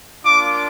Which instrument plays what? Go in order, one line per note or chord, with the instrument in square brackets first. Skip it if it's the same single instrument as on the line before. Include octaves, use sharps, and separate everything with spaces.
[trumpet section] A#3 D4 F4 D6